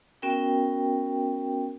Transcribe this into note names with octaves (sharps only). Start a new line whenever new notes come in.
B3 C#4 F#4 A#4 G5